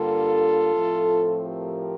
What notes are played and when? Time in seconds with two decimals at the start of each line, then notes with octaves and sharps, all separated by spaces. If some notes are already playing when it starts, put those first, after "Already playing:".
Already playing: G2 D3 G3 A#3 F4 A4
0.74 A2 F3 A3 C4
1.48 G4 A#4